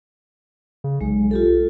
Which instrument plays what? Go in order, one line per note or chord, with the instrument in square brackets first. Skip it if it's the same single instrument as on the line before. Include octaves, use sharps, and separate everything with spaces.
[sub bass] C#3
[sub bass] B1 [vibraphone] G#3
[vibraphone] F4 G4 A4